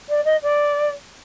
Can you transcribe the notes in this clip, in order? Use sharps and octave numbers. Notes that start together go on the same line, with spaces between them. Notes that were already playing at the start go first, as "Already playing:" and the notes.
D5
D#5
D5